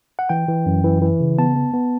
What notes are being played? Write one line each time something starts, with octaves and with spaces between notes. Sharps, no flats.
F#5
E3 G5
E3
F#2
E3
E3
C#3
B3 A5
B3
B3